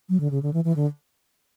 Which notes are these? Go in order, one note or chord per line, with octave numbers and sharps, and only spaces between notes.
F#3
D3
C#3
D3
E3
E3
D3